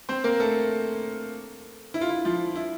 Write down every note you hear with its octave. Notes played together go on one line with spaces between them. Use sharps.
C4 C5
A#3 A#4
A3 A4
E4
F4
E4
F3 F4
E4